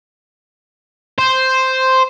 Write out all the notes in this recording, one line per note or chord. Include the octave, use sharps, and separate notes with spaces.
C5